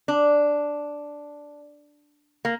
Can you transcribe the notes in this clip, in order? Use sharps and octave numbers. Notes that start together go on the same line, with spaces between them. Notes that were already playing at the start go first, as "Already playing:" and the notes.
D4
A#3